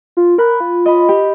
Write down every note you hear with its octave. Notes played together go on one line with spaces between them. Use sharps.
F4
A#4 B5 F#6
F4
D#5 B5
G4